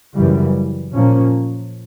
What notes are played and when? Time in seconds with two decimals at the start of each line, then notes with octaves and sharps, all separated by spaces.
0.17 F#2 C#3 E3 G3
0.93 A#2 F3 A#3 C#4